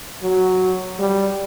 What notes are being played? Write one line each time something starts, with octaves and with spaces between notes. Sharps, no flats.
F#3
G3